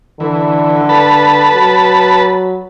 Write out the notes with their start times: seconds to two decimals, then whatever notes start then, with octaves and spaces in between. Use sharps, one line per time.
0.20 D3 E3
0.89 B4 A5 B5
1.54 F#3